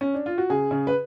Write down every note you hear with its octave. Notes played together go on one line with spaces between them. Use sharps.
C#4
D4
F4
F#4
C#3 G#4
C#3
B4